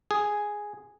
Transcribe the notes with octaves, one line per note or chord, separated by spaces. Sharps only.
G#4